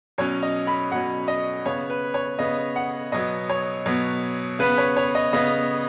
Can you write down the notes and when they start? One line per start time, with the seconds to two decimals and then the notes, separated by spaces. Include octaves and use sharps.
0.18 B2 F#3 C#4 C#5
0.43 D#5
0.67 B5
0.92 B2 F#3 C#4 F#5
1.28 D#5
1.65 C#3 B3 C#5
1.90 B4
2.14 C#5
2.39 C#3 B3 D#5
2.76 F#5
3.12 B2 F#3 B3 D#5
3.49 C#5
3.86 B2 F#3 B3
4.59 C#3 B3 B4
4.78 C#5
4.97 C#5
5.15 D#5
5.33 C#3 B3 D#5